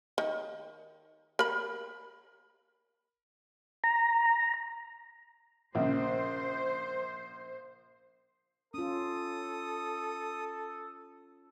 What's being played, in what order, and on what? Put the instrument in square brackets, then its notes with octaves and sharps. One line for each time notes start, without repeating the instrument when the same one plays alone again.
[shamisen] D#3
A#4 B5
[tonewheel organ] A#5
[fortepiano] A#1 C#3 [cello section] C5
[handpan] C#4 F4 [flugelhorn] A4 [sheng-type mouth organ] D#6